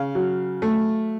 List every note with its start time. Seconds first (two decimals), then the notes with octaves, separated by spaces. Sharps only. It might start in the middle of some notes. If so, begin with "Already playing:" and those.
Already playing: C#3 F5
0.15 F#3
0.62 A3